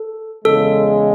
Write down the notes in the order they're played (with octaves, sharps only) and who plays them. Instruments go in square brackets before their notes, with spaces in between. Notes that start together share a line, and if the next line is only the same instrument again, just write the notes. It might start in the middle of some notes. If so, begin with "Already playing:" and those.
Already playing: [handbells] A4
[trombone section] E2 C#3 G#3 [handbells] A4